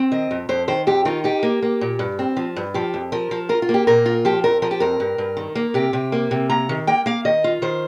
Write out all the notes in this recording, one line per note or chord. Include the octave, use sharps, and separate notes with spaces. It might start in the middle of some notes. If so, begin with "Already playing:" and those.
Already playing: C4
D#3 D#5
F2
F2 C5
D#3 C5
F2 G4
D#3 F4
D#4 G4
A#3
A#3
A#2
G2
C4
F3
G2
F3 G4
F2
F3 A#4
F3
F4 A#4
F4
A#3
G4
A#2 A#4
F4
F3 G4
F2 A#4
F3 A#4
G4
F2 A#4
G2
G2
D#3
A#3
C3 G4
C3
A#3
C3
A#3 A#5
D#3
A#3 G5
A#3 F5
D#3 D#5
F4
D#3 C5